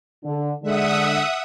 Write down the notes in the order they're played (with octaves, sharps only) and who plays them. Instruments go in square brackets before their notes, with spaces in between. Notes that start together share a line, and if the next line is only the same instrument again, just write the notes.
[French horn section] D3
[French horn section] D3 G#3 [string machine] E5 F#5 D#6